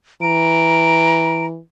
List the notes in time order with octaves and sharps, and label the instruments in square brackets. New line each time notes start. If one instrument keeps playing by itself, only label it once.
[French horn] E3 [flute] A#5 [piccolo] D7